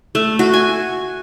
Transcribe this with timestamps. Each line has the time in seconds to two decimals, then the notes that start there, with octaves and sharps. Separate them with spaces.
0.15 A3
0.39 F#4
0.54 G#5